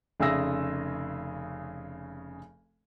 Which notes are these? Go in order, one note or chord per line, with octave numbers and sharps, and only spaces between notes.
F1 C#3 G#4 E5 E6 A#6